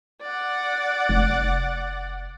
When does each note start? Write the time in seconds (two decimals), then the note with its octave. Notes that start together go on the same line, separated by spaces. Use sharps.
0.22 D5 F#5
1.09 F1